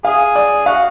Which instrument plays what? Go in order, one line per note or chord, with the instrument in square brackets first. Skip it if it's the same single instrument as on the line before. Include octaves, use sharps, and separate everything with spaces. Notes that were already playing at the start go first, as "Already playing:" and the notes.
[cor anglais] G#4 [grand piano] F5
[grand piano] D5
[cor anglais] F#4 [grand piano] F5